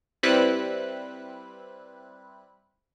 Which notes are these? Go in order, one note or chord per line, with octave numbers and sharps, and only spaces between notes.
G3 C4 E4 B4 F#6